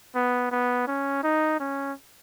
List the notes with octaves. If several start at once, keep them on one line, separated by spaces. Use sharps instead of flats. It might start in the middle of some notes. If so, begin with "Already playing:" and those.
B3
B3
C#4
D#4
C#4